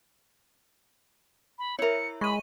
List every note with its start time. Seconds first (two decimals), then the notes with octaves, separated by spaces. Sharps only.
1.59 B5
1.79 E4 A#4 C#5 E5 C#7
2.21 G#3 B5 C#6 D#7